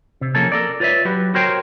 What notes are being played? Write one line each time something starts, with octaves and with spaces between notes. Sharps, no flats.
C3
F3 A#3 C#4 G#4 A4
A4 A#4 D5
F4 B4 C#5 D5 E5
F#3 F#4 G4 B4
F#4 G4 A#4 C5 C#5 G5